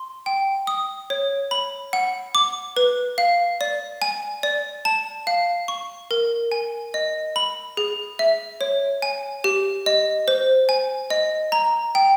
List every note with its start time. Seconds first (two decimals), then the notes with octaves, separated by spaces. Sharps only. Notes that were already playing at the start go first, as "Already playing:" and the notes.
Already playing: C6
0.26 G5
0.67 D#6
1.10 C#5
1.51 B5
1.93 F#5
2.35 D6
2.77 B4
3.18 F5
3.61 D5
4.02 G#5
4.43 D5
4.85 A5
5.27 F5
5.68 C#6
6.11 A#4
6.52 G#5
6.94 D#5
7.36 B5
7.77 G#4
8.19 E5
8.61 C#5
9.02 G#5
9.44 G4
9.86 D#5
10.28 C5
10.69 G#5
11.10 D#5
11.52 A#5
11.95 G5